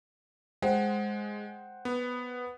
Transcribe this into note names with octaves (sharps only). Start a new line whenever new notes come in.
G#3 C5 F#5 G5
B3